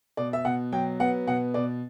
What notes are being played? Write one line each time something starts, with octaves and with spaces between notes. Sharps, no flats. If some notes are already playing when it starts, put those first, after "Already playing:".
B2 D5
E5
B2 F#5
F#3 G5
B3 F#5
B2 F#5
B2 D5